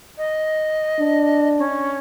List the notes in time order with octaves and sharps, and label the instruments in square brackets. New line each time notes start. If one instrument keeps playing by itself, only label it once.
[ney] D#5
[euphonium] D4
[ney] C#4